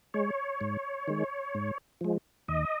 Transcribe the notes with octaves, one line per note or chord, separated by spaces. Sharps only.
G#3 C#5
G#2
D#3 G#3
G#2
F3 G#3
D#2 D#5